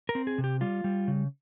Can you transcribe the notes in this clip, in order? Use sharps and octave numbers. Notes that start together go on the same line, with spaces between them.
A#4
C4
G#4
C3
G4
G3 F4
G3
C#3